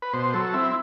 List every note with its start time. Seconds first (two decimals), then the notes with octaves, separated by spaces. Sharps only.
0.02 B4
0.13 B2 C5
0.34 F#3 A4
0.54 C4 E4